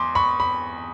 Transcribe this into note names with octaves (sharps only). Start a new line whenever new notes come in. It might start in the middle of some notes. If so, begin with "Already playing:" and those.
Already playing: E2 C6 D6
B5 C#6
B5